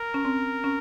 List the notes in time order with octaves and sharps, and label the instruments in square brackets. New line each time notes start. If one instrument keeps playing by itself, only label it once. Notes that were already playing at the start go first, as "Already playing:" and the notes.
Already playing: [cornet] A#4
[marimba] C#4
C4
C#4